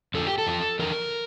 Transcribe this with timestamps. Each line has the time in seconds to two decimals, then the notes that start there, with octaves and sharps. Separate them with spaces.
0.14 F2 D3 F3 A4
0.27 G4
0.38 A4
0.47 F2 D3
0.51 F3
0.79 E2 D3 F3 A#4